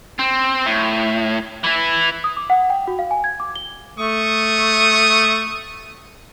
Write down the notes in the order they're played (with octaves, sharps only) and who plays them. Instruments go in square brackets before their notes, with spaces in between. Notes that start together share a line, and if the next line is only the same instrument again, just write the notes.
[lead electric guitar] C4
A2
E3 E4
[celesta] D#6
D6
F#5
G5
F#4
F5
G#5
G#6
D6
G7
[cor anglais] A3 [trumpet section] C#6 D#6